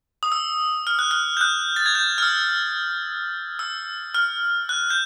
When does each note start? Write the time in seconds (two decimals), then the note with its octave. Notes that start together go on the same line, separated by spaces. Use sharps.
0.23 D#6
0.32 E6
0.87 F6
0.99 F#6
1.11 F6
1.37 G6
1.41 F#6
1.76 A6
1.86 G#6
1.95 G6
2.18 F6
2.23 E6
3.59 E6
4.14 F6
4.69 F#6
4.90 G6